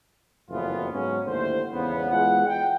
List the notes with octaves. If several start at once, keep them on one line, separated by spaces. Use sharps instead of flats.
F#1 F2 A2 E3 B3 F4
G#2 F#3 B3 C#4
D#2 A2 D3 C5
E2 G#2 C#3 B3
E2 G#3 F4 F#5
G5